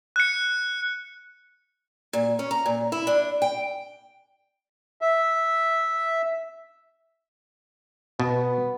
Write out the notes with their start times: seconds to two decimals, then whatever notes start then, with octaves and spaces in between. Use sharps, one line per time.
0.16 F#6 C#7
2.13 A#2
2.39 C#4
2.51 A#5
2.66 A#2
2.92 E4
3.07 D4
3.42 G5
5.01 E5
8.20 B2 B3